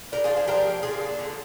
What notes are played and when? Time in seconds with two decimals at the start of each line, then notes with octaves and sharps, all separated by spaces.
0.12 D4 G4 A#4
0.24 F4 G#4
0.31 F3
0.36 G#4 C5
0.47 D4 G4 A#4
0.66 A#3
0.83 D3 F4 G#4
1.01 D4
1.19 D3